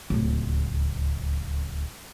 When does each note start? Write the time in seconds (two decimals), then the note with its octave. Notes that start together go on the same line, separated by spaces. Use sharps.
0.10 D1 C#2